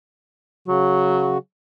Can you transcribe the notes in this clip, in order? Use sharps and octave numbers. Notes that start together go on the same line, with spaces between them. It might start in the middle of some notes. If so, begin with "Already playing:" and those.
C#3 F#3 F#4